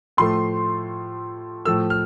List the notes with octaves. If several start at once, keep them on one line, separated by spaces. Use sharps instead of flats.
A2 F3 A3 C6
A2 F3 A3 E6
F6